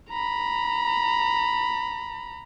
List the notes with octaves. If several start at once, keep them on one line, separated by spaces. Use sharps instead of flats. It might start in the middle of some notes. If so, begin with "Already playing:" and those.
A#5 B5